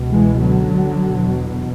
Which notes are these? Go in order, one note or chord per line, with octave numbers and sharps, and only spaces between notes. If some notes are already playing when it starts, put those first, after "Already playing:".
Already playing: C#2 B2
E3 G#3
D3 F#3
E2 B2